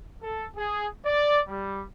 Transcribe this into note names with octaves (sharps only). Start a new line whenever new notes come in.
A4
G#4
D5
G3